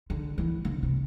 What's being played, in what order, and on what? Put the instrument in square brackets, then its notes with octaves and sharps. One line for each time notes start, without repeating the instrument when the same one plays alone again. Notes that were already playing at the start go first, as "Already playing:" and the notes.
[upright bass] D3
E3
D3
C3